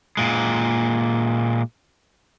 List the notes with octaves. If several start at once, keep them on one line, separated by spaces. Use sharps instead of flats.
A#2 G#3